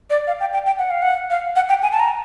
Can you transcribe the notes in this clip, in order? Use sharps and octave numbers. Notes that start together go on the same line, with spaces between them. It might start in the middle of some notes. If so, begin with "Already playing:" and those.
D5
F5
G5
G5
G5
F#5
F5
F#5
F5
F#5
G5
G#5
A5
A#5